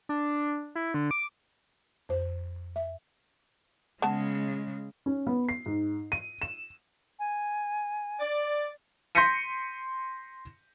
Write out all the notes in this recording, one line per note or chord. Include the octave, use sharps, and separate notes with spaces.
D4
E4
D3
D6
F2 C5
E5
C#3 G#3 B3 A5
C#4
B3
C7
G#2
D#7
E7
G#5
D5
C6 G6 A#6 B6 C#7 D#7